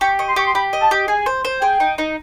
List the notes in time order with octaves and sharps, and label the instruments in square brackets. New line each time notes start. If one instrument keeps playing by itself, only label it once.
[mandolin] G4 [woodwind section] C#6
[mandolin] D#5 [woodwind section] C#6
[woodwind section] C6
[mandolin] G4 [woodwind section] C#6
[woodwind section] C6
[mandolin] G4 [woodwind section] B5
[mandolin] D#5
[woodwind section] A5
[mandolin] G4
[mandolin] G#4 [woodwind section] G#5
[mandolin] C5
C5
[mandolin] G#4 [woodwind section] G5
[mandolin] D#4
D#4